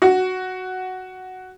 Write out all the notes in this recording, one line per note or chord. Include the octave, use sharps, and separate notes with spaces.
F#4